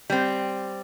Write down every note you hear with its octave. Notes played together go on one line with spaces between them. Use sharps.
G3 C4